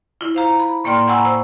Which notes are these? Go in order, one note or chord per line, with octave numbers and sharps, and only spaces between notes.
E4 F4
C5 F5 A#5
B5
A2 A#3 D5 G5 C6 F6
F#5 G#5 A#5 B5 C#6 E6
C5 E6